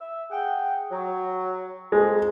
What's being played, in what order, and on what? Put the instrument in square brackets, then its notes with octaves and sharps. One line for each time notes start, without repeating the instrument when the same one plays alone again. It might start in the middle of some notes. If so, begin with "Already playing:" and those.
[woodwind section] E5
G#4 F#5 G5
F#3
[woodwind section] F2 [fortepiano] G#3